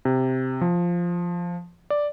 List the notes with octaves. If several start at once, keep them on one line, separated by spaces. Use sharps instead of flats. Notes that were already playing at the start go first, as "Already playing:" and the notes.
C3
F3
D5